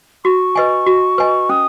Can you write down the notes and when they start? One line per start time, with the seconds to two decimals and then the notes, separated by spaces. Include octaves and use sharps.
0.25 F#4 C#6
0.56 B4 D#5 G#5
0.87 F#4
1.18 B4 D#5 G#5
1.49 C#4 D#6